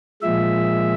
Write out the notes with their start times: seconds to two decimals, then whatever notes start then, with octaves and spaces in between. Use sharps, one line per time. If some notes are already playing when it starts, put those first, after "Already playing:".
0.22 A#2 F3 G#3 E5